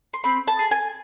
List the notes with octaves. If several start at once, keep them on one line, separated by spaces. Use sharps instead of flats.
C6
C4 B5
A5
G#4
G#5